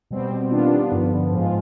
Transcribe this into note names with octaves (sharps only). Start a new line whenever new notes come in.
B2 G3 C4
D#3 G3 B3 D4 F4
G2 D3 F3 B3
G#2 F3 G#3 C4 F4